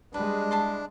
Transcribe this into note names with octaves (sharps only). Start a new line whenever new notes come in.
G3 G#3 D4 B4
E4 A5 C6